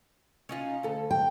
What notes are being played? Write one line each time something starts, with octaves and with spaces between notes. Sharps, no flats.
C#4 D#4 F4
D2 A4
G5